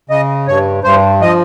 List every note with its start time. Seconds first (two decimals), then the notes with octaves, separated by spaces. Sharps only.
0.10 C#3 D#5
0.47 G2 C#5
0.84 G2 C5
1.21 F3 D#5